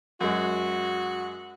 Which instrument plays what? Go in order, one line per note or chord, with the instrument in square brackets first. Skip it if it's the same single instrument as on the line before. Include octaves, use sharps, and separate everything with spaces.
[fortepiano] F#2 G#3 [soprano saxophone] F#4